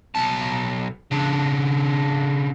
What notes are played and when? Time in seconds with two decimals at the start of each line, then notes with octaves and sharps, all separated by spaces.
0.15 B1 A5
1.12 C#3 D4